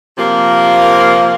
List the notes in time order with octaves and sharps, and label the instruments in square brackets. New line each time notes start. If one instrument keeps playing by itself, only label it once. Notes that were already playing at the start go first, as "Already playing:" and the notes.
[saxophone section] C3 F3 A#3